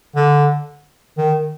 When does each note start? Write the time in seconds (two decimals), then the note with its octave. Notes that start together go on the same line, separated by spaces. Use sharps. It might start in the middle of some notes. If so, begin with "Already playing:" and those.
0.16 D3
1.18 D#3